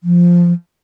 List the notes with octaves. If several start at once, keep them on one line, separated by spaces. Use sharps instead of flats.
F3